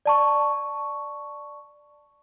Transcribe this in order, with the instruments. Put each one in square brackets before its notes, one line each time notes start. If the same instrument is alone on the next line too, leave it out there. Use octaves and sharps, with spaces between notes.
[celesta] D5 A5 C#6